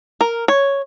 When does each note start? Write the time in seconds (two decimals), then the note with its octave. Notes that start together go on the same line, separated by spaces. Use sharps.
0.21 A#4
0.48 C#5